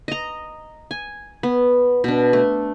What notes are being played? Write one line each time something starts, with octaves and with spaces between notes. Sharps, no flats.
D#5 A#5
G#5
B3
B2 D4
A3